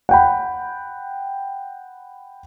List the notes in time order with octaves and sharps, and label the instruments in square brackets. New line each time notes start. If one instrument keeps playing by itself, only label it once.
[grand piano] F#5 G5 B5